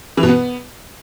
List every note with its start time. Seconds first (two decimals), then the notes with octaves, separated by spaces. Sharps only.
0.17 E3
0.23 B2
0.29 B3